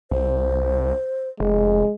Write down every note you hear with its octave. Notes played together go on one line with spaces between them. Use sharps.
C2 C5
F1 G#3